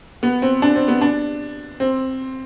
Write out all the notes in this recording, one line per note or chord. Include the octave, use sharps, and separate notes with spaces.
B3
C4
D4
C4
B3
D4
C4